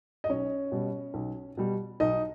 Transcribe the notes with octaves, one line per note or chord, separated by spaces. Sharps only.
D#5
B1 C#4 C#5
B2 G3
B1
B2 G3
B1 D#4 D#5